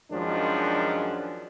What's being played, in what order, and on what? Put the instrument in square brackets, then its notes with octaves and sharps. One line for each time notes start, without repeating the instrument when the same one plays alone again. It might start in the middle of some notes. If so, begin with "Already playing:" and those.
[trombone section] F#2 D#3 F3 G#3 D4